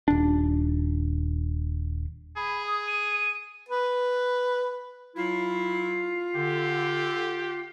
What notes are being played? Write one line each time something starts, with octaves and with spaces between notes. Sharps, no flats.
D#1 D4
G#4 B5
D#6
D#7
B4
F#3 E4 F4
D3 G4